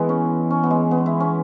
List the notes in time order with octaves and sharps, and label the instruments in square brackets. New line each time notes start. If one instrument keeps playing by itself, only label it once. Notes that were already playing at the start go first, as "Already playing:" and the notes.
Already playing: [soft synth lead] E3 [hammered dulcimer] G#3 B3
[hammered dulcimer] C#4
C#4
B3
G#3
B3
E4
C#4